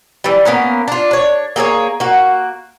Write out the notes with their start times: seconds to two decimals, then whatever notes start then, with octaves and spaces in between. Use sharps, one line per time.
0.24 E3 G3
0.45 A#3 B3 C#4 A#4
0.88 D4 F4
1.11 D4 C#5
1.56 A#3 G#4 A4 C#5
2.00 A#3 F#4